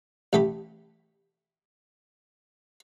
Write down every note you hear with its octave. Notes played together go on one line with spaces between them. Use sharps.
A1 A3 G4 B5